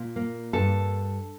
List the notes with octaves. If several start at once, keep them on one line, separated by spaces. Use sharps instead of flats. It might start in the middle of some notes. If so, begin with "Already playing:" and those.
Already playing: A#2
A#3
G2 A4